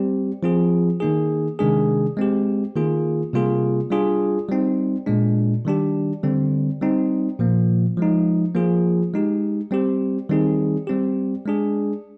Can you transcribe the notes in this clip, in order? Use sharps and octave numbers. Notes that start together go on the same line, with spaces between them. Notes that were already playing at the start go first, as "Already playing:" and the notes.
Already playing: G3 C4 G4
F3 C4 F4 G#4
D#3 A#3 D#4 G#4
C3 D#3 G#3 D4 G#4
G#3 C4 G4
D#3 A#3 F4 G#4
C3 G3 A#3 F4 G#4
G3 D4 F4 G#4
G3 C4 D#4
A#2 G#3 D4
D#3 G3 D4 G4
D3 G3 C4
G3 C4 D#4
A#2 F3 A#3
F3 G#3 D#4
F3 A#3 F4 G#4
G#3 D#4 G4
G3 C4 G4
D#3 G3 C4 D#4 G#4
G3 C4 G4
G#3 D4 G#4